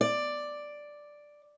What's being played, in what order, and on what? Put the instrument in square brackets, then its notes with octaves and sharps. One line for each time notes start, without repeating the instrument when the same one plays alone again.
[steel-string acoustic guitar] D5